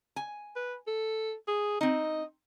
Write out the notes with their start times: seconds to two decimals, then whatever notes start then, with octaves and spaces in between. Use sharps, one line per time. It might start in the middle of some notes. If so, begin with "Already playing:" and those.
0.16 G#5
0.56 B4
0.87 A4
1.48 G#4
1.81 C4 D#4 D#5